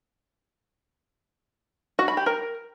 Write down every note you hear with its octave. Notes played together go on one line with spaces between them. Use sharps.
F#4
B5
G4
A#4